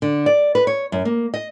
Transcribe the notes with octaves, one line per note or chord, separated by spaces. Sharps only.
D3
D5
B4
C#5
F#2
A#3
D#5